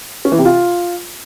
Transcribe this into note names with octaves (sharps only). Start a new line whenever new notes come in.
C#4
E3
C3
F4